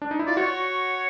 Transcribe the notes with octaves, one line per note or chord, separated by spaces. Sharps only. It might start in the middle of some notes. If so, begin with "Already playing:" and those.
D4
D#4
E4
F4 D5
F#4 C#5